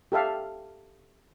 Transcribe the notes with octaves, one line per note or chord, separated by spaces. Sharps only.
G4 A4 E5 F5